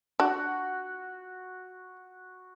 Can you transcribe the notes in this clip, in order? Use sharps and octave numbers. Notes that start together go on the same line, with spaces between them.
D4 F#4